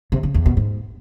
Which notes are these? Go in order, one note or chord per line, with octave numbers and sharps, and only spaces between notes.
C3
C#3
E2
B2
G#2